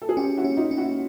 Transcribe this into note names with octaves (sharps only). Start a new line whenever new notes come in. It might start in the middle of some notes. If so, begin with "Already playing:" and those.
A4
G#4
C#4 F4 G4
E4 F#4
C#4
D#4 F4
C#4
E4 F#4